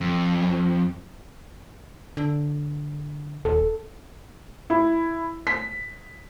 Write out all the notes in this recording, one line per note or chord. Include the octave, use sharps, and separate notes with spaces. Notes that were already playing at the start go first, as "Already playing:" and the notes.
F2
D3
D#1 A4
E4
B6